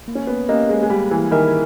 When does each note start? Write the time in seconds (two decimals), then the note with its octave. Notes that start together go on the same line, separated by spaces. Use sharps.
0.08 A#3
0.15 C#4
0.27 B3
0.49 A#3 C#4 G4 B4 D#5
0.69 G#3
0.83 G#3
0.90 G3 A#3
1.11 E3
1.31 D#3 E4 A#4 E5 G#5